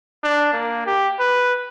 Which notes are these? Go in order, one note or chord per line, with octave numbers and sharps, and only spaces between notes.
D4
A#3
G4
B4